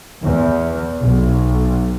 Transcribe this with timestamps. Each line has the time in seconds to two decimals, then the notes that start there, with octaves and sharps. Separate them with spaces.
0.25 E2
1.02 B1